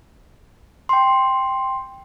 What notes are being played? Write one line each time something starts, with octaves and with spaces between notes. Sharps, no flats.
G5 C6